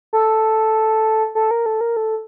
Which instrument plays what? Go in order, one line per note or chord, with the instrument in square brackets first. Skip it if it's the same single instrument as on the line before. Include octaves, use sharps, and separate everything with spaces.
[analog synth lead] A4
A4
A#4
A4
A#4
A4